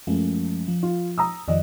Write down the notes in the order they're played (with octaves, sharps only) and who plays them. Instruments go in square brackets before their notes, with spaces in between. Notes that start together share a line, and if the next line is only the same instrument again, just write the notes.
[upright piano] F#2 [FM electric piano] F3 G#3 A3
[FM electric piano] F3
[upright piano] F4
A#5 D#6 E6
[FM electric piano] F2 D#3 F3 [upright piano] D5 D#5